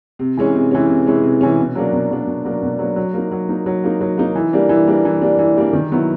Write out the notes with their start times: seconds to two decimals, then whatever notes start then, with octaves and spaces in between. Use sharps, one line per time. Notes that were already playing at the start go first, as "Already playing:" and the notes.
0.19 C3
0.37 E3 G#3 C#4
0.55 C3
0.71 E3 G#3 C#4
0.89 C3
1.07 E3 G#3 C#4
1.23 C3
1.41 E3 G#3 C#4
1.59 B2
1.75 F#3 A#3 D4
1.93 B2
2.11 F#3 A#3 D4
2.27 B2
2.45 F#3 A#3 D4
2.62 B2
2.79 F#3 A#3 D4
2.96 F#3
3.13 A#3 D#4
3.31 F#3
3.49 A#3 D#4
3.66 F#3
3.84 A#3 D#4
4.01 F#3
4.18 A#3 D#4
4.35 E3
4.53 G3 A#3 D4
4.69 E3
4.87 G3 A#3 D4
5.05 E3
5.22 G3 A#3 D4
5.39 E3
5.56 G3 A#3 D4
5.73 D#3
5.92 F#3 B3 E4